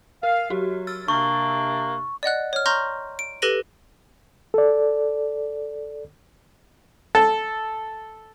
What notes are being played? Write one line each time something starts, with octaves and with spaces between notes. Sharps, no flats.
A#4 F5
F#3 F#4 G4
E6 F6 A6
C3 A#3 D4 C#6
D5 D#5 F#5 F#6
C#5 F6
A#5 C6 C#6 F6 G6 A#6
D7
G4 A4 B4 A#6 D#7 F#7
A4 D5
A4